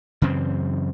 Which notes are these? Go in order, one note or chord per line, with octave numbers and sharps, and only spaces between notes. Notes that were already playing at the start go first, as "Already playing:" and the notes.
F#2 C#3 E3 C4